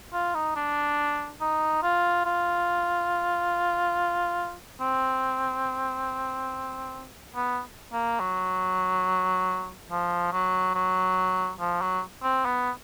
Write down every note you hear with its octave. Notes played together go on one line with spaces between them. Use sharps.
F4
D#4
D4
D#4
F4
F4
C4
B3
A#3
F#3
F3
F#3
F#3
F3
F#3
C4
B3